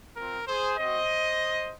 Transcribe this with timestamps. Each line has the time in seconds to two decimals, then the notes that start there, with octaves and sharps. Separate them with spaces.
0.17 C4 F4 A#4
0.47 G#4 C5
0.77 C4 F#4 C5 D#5